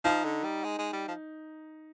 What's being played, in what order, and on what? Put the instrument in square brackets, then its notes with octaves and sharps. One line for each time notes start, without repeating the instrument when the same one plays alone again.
[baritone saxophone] F3 [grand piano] D#4
[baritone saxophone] D3
G3
G#3
G#3
G3
F3